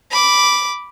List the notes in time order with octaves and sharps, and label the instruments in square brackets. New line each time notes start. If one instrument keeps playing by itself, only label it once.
[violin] B5 D6